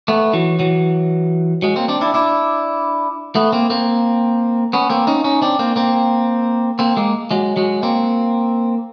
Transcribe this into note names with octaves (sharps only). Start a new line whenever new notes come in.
A3 B3
E3 F#3
E3 F#3
F#3 G#3
A#3 C4
C4 D4
D4 E4
D4 E4
A3 B3
A#3 C4
A#3 C4
B3 C#4
A#3 C4
C#4 D#4
C#4 D#4
C4 D4
A#3 C4
A#3 C4
A#3 C4
G#3 A#3
F#3 G#3
F#3 G#3
A#3 C4